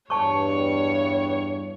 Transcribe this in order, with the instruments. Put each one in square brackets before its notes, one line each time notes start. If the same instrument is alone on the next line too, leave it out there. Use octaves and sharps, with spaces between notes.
[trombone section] E2 G2 [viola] C#5 [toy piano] A5 C#6